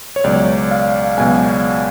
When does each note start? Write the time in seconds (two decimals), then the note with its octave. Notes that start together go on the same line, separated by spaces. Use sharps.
0.16 C#5
0.24 C#2 B2 F#3 D5
0.71 F5
1.17 C#2 B2 F#3 G#5